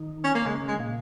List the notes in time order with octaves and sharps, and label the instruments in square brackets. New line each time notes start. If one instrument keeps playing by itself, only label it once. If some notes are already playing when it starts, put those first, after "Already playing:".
Already playing: [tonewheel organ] D#3 D#4
[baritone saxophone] C#4
A#3
[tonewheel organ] C#3 C#4 [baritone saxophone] G#3
[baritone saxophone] G#3
[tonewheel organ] A#2 A#3